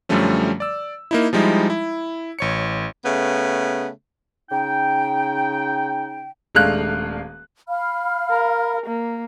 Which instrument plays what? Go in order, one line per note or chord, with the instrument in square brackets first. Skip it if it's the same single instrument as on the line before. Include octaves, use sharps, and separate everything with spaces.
[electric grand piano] F#2 D3 F3 G3 A3 C#4
D5 E6
A#3 D#4 E4
F3 G3 G#3 D#4 E4
E4
A1 C#5 C#7
[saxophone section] C#3 A3 B3
[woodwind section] C#3 D#4 G5
[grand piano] D#1 G#3 A3 D4 F5 F#6
[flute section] F5 B5 F6
[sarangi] A#4
A#3